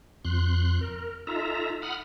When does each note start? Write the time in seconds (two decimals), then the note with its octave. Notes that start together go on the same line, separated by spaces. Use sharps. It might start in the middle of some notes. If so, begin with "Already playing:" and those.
0.25 F2 C6 F#6
0.81 A#4
1.27 D#4 F4 A4 E5 A#5
1.82 F#5 B5 D#6 F6